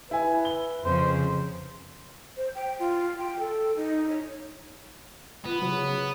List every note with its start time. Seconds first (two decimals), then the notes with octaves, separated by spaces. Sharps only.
0.11 E4 B4 G#5
0.45 G7
0.84 F2 C#3 C5
2.37 C5
2.55 G5
2.79 F4
3.18 G5
3.39 A4
3.76 D#4
4.09 C#5
5.46 B3 F4
5.62 C#3 F#3